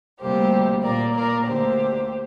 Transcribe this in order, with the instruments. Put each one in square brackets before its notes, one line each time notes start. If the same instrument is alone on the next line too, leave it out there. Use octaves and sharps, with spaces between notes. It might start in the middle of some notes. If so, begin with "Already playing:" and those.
[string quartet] D2 C3 G3 A#3 G4 C5
A#2 A#3 A#4 D5
A#4 D5
D2 D3 A#3 G4 C5